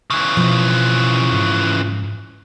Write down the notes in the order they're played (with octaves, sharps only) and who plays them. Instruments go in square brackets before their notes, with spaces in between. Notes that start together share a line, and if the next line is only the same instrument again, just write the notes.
[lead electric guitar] C#3 E3
[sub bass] B2 [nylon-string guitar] F3
[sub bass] G#2